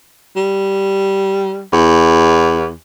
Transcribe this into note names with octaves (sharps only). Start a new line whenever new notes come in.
G3
E2